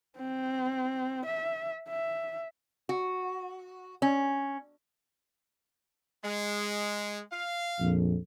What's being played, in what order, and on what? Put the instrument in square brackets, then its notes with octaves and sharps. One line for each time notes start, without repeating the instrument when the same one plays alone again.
[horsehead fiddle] C4
E5
E5
[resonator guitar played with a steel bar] F#4
C#4
[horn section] G#3
F5
[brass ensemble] A#1 F2